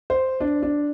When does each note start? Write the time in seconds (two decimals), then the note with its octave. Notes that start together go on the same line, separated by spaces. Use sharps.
0.10 C5
0.41 D4
0.62 D4